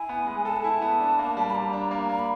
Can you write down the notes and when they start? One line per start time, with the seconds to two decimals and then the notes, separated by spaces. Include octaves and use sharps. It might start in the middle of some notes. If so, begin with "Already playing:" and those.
Already playing: E4 G#5
0.09 B3
0.26 G#3
0.45 A4 A5
0.56 G#5
0.64 E4 A5
0.82 B3
1.00 D4
1.19 A#3
1.37 G3
1.50 B5
1.55 G3 A#5
1.73 D4
1.91 A#3
2.09 A#3 A#5
2.19 B5